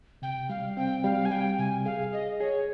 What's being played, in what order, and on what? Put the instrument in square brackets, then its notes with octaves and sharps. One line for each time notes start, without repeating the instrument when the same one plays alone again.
[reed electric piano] C3 [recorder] G5
[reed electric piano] G3 [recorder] F5
[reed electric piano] C4 [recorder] G5
[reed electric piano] G3 [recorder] F5
[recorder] G#5
[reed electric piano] G3 [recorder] G5
[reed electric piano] C3 [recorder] G#5
[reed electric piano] G#4 [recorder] F5
[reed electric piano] G#4 [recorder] D#5
[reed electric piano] G#4 [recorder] C#5